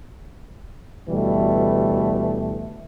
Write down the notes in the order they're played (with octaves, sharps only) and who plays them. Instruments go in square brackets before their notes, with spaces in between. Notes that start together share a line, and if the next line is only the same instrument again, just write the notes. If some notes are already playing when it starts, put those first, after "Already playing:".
[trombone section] D2 B2 E3 G3 A3